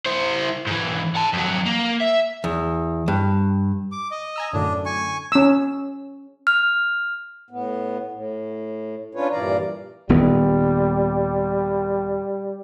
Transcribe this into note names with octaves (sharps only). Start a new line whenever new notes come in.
E4 C5
G#2 E3
F#5 A5
F2 F#3
A#3
E5
E2
G2
D6
D#5
G#5 A#5 E6
F#2 A2 D3 D4
G#5 C#6
C#4 E6
F6
A2 B3
A2
C#4 D4 F4 B4 C#5
G2 A#2 E3 D5 F5 A#5
D#1 D#2 G3 B3